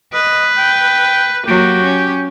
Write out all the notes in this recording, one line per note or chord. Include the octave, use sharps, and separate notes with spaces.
B4 D#5
G5
F#3 A#3 G4
C#4